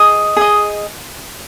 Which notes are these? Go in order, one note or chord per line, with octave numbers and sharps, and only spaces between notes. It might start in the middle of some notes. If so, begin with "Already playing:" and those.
Already playing: G#4 D#5 D#6
G#4 D#5